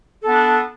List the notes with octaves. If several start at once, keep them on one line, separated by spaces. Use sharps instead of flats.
B3 D4 A4